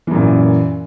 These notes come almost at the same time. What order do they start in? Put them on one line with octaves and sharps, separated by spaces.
E3 F#2 A#2